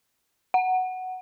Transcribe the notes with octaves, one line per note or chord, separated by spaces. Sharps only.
F#5